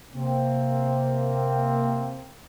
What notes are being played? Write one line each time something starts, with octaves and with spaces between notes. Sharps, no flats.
C3 A#3 C4